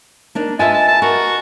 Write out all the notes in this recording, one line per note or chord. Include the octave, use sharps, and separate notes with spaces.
A#3 D4 D#4
F4 B4 D#5 E5 G#5 A5
A5
A5
F#4 A#4